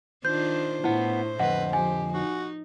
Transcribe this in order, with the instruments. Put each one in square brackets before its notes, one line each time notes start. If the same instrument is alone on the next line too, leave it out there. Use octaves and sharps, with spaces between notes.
[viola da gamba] D#3 D4 F4 [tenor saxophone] C5 [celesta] G6
[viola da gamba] A2 [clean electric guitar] B3 F#5 [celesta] E4
[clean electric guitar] F2 D3 D#5 [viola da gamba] B4 [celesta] F#5
[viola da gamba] F3 G4 [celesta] G#5
[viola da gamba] D#4 [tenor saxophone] F#4